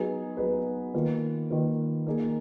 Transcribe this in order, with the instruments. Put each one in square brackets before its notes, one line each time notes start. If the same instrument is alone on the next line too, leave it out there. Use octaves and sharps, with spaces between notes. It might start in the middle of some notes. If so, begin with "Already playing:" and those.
Already playing: [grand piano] F#3 B3 D#4 G#4 B4
F#3 B3 D#4 G#4 B4
D#3 A#3 F4 B4
D#3 A#3 F4 B4
A#3 D#4 G#4